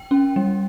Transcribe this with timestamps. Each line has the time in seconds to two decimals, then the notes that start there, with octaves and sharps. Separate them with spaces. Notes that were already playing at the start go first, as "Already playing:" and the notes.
Already playing: G5
0.11 C#4
0.36 G3